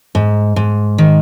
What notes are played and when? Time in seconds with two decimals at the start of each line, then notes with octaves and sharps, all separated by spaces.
0.15 G#2
0.56 G#2
0.98 D#3